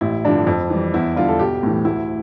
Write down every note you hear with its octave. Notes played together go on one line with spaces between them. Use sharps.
A1 E4
G2 D3 F3 D4
F2
E3 G3
E2 E4
D3 G3 F4
A4
B1 G4
A2 E3
D2 E4